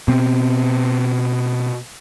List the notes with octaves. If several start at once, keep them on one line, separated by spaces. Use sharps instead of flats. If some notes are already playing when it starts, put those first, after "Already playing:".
B2 C4